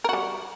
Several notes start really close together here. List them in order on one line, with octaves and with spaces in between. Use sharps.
A#4 F#4 G3